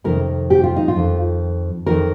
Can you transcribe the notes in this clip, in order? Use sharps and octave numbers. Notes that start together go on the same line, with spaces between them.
F2 C3 D#3 A#4
G4
F4
D#4
F4
F2 D#3
F2 D#3 A#4